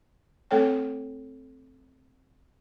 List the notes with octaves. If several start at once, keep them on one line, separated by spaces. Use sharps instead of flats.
A3 C4 A4 C#5 G5